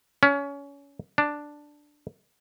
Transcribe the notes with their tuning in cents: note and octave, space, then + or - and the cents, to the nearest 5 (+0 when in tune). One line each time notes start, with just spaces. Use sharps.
C#4 +25
D4 +5